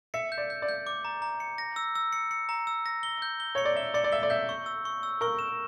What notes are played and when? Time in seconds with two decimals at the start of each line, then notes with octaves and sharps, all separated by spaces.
0.14 E5 C#7
0.32 G6
0.38 D5
0.50 G6
0.62 D5
0.69 G6
0.87 D6
1.05 A#5
1.22 A#5
1.40 C#7
1.58 A#6
1.76 E6
1.95 E6
2.13 C#7
2.31 C#7
2.49 A#5
2.67 E6
2.86 A#6
3.03 G7
3.22 G6
3.40 G7
3.55 C#5 C#7
3.65 D5
3.76 E5 G7
3.94 D5 C#7
4.04 D5
4.12 E5 G7
4.23 D5
4.30 E5 G6
4.49 C#6
4.66 E6
4.85 C#6
5.03 E6
5.21 A#4 C#6
5.39 E7